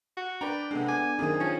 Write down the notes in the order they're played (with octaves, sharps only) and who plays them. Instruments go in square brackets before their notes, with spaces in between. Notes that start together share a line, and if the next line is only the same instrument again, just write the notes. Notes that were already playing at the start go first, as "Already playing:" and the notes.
[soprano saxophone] F#4
[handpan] D4 [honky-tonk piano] B4 D5 A#5 [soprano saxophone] G5
[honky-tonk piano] C3 G#3 [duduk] B3 [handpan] D4 A4
[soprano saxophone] G#5 [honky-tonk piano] D6
[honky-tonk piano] F#2 A#3 D#7 [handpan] D#3 C4 D#4 [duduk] G#4
[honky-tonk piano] F3 F4 [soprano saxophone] C#4